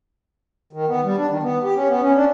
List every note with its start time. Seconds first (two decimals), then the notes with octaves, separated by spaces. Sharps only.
0.73 D#3
0.88 B3
1.04 G3
1.18 D4
1.30 D#3
1.43 B3
1.63 G4
1.76 C#4
1.89 B3
2.02 C#4
2.16 D4